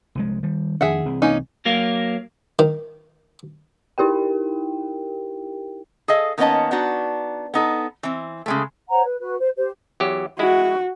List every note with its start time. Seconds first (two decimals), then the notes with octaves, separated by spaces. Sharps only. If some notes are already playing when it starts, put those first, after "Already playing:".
0.15 C2 F3 G#3
0.43 D#3 G3
0.81 F2 D#3 D4 G#4 E5 F#5
1.06 C2 E3 C4
1.22 A#3 C#4 D#4
1.65 F#3 A#3 A#4 F5
2.59 D#3
3.98 D#4 E4 G4 A#4 G5
6.08 G#4 A4 D#5 F5
6.38 D#3 A#3 B3 C#4 D#5 A5
6.71 B3 D4 D#4 F#4
7.54 B3 D#4 A4
8.03 E3 C4
8.46 C#3 G#3 A3
8.90 C5 C#5 F#5 A#5
9.05 B4
9.19 F#4 B4
9.39 C5
9.56 G4 C5
10.00 E2 F#3 G4
10.39 G#3 E4 F#4